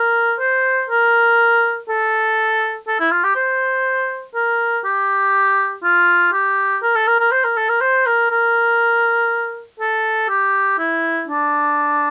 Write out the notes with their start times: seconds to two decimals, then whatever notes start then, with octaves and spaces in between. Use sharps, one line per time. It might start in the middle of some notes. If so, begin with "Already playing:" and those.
Already playing: A#4
0.39 C5
0.89 A#4
1.88 A4
2.87 A4
2.99 E4
3.11 F4
3.23 G4
3.36 C5
4.34 A#4
4.84 G4
5.83 F4
6.32 G4
6.82 A#4
6.95 A4
7.07 A#4
7.20 A#4
7.32 C5
7.44 A#4
7.56 A4
7.69 A#4
7.81 C5
8.06 A#4
8.30 A#4
9.79 A4
10.29 G4
10.78 E4
11.28 D4